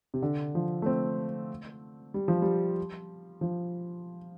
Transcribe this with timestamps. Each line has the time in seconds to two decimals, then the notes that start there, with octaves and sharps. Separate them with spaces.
0.14 C3
0.22 D3
0.55 F3
0.82 A3
0.86 C4
2.14 G3
2.28 F3
2.42 G3
3.41 F3